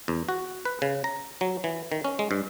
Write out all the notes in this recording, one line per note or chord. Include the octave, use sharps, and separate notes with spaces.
E2
F#4
B4
C#3
A#5
F#3
E3
D#3
C#4
G#3
G2